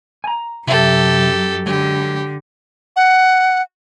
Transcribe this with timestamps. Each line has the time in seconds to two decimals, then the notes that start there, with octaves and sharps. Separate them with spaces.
0.24 G#5 A#5
0.67 F#2 C3 F#3 G4 A4 E5 A5
1.66 D3 F#3 G#3 G4
2.96 F#5